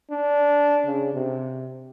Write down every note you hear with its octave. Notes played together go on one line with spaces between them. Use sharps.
D4
C#3
C3